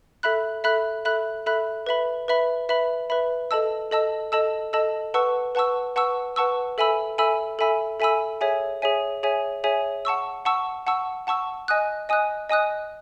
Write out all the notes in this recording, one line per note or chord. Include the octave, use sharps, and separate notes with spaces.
A4 E5 B5 F#6
A4 E5 B5 F#6
A4 E5 B5 F#6
A4 E5 B5 F#6
B4 E5 B5
B4 E5 B5
B4 E5 B5
B4 E5 B5
A4 D#5 A5 E6
A4 D#5 A5 E6
A4 D#5 A5 E6
A4 D#5 A5 E6
B4 F#5 A5 C#6 E6
B4 F#5 A5 C#6 E6
B4 F#5 A5 C#6 E6
B4 F#5 A5 C#6 E6
A4 E5 G#5 B5 E6
A4 E5 G#5 B5 E6
A4 E5 G#5 B5 E6
A4 E5 G#5 B5 E6
G#4 C#5 E5 G#5
G#4 C#5 E5 G#5
G#4 C#5 E5 G#5
G#4 C#5 E5 G#5
F#5 A5 C#6 E6
F#5 A5 C#6 E6
F#5 A5 C#6 E6
F#5 A5 C#6 E6
D#5 G#5 D#6 F#6
D#5 G#5 D#6 F#6
D#5 G#5 D#6 F#6